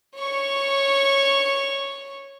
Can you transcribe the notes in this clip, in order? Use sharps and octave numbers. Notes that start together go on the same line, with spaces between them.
C#5 C#6